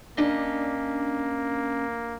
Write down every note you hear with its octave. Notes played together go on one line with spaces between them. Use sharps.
A#3 C#4 D4 D#5